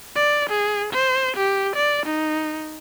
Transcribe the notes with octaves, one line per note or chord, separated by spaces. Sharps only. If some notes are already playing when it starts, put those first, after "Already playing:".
D5
G#4
C5
G4
D5
D#4